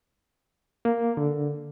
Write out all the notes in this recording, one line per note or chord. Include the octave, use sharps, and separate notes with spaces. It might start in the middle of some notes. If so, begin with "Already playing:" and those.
A#3
D3